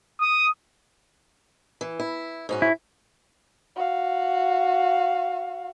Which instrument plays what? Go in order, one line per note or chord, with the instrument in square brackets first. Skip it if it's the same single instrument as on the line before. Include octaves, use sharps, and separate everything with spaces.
[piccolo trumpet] D#6
[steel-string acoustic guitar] E3
E4
G#2 C#4 F#4
[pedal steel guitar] E4
[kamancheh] F#4 F5